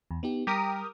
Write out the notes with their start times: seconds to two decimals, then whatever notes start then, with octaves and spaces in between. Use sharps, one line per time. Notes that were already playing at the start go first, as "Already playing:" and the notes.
0.11 E2
0.23 B3 D#4 G4
0.47 G3 G4 A#4 D#6